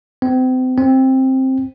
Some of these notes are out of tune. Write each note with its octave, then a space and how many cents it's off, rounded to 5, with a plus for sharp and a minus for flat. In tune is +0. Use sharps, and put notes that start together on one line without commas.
C4 -35
C4 +10